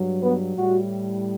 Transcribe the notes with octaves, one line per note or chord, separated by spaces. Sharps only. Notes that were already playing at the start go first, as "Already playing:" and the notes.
Already playing: G2 F#3
B3
A2 G3 F#4